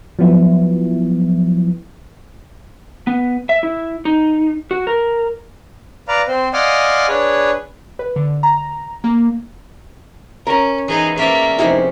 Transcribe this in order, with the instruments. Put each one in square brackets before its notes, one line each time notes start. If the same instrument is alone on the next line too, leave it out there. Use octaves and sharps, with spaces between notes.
[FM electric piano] F3 F#3 B3 E4
[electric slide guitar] B3
E5
E4
D#4
F#4
A#4
[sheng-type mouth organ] B4 D5 F5 A#5
C4 C5
D5 D#5 F5 F#5 G#5 C6
D4 G#4 B4 C#5
[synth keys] B4
D3
A#5
A#3
[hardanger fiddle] C#4 [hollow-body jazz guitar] A#4 A#5
[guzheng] E3 G#3 B3 [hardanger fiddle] D#4 G#4
[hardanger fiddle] A#3 E5 [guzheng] C#4 D5 F5
[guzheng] F2 C3 C#4 [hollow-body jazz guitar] D#4 E4 G#4